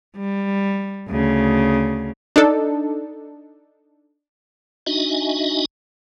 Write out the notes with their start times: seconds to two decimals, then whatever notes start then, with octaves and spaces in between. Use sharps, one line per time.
0.16 G3
1.08 D2 C#3
2.36 D4 D#4 A4
4.87 D4 D#4 F#4 D#5 E5 G#5